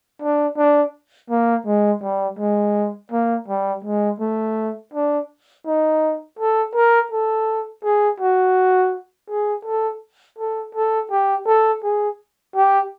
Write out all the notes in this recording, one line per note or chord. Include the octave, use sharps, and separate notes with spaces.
D4
D4
A#3
G#3
G3
G#3
A#3
G3
G#3
A3
D4
D#4
A4
A#4
A4
G#4
F#4
G#4
A4
A4
A4
G4
A4
G#4
G4